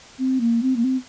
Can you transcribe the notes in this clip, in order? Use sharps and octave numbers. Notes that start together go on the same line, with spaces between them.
C4
A#3
C4
A#3
C4